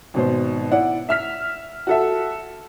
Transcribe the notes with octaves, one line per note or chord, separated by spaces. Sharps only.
G#1 B2 C5
E4 D5 F#5
E5 F6 B6
F#4 A4 E5